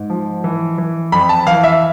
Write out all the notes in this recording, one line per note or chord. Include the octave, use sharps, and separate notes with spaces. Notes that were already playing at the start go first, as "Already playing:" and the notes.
Already playing: G#2
F3
E3
E3
F2 B5
A5
E3 F5
E5